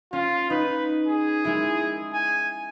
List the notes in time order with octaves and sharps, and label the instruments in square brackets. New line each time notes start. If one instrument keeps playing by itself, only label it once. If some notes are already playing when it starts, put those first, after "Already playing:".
[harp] C#4 [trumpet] F4
[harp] D#4 [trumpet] B4
[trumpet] G#4
[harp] G#3 E4
[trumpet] G#5